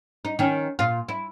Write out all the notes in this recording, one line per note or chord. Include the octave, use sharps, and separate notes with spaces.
D#4
D#3 C#4
A#2 F4
E4